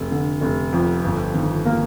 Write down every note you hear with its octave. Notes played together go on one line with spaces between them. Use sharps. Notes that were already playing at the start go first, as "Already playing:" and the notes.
Already playing: F1
D3
F1
F2
G1
D#3
A#3